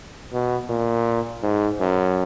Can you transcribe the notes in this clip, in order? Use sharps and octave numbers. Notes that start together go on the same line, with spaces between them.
B2
A#2
G#2
F#2